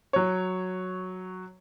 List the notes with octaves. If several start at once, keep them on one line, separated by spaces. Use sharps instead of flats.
F#3 C#5